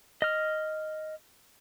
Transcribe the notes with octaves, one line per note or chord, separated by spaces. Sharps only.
D#5 F6